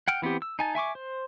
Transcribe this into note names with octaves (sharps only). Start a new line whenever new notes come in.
F#5 G5 F6
E3 B3 C4 G4
E6
D#4 G#5 A5
E5 G#5 C#6 D6
C5